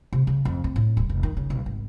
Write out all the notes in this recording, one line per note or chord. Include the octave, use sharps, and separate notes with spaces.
C3
C#3
F2
C4
A2
D#1
F1
D#3
C#3
B1
G#1